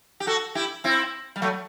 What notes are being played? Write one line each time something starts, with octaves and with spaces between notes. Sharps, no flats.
G4
F#4 A4
E4 G4
C4 E4
G3
F#3 A3